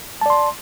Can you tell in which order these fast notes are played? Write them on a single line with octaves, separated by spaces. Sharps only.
A5 D5 C6